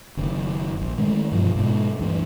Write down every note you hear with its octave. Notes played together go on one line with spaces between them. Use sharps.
F#1 D#3
A#1
D#3 G#3 A3
G2 B2 F3
G#2 B2 G#3
D2 G2 E3